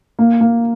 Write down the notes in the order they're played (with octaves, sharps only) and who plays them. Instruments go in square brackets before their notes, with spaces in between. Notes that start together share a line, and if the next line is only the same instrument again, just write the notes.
[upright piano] A#3
A#3